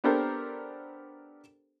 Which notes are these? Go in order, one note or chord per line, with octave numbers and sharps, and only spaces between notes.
B3 D4 G4 A4 A#4 C5